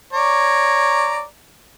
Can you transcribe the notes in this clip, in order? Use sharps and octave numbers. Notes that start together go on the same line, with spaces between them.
C#5 D5 A#5